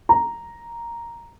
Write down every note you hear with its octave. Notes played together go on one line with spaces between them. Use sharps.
A#5